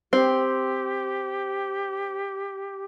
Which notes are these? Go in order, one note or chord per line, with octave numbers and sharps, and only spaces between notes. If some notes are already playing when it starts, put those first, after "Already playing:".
C4 G4